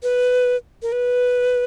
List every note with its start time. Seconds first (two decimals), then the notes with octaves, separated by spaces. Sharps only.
0.03 B4
0.82 A#4
0.92 B4